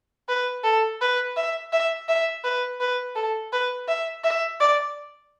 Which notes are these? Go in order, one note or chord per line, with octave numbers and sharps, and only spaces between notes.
B4
A4
B4
E5
E5
E5
B4
B4
A4
B4
E5
E5
D5